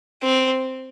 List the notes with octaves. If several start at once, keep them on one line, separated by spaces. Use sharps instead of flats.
C4